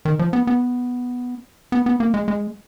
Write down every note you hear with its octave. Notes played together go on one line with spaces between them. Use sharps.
D#3
F3
B3
B3
B3
B3
A#3
G#3
G#3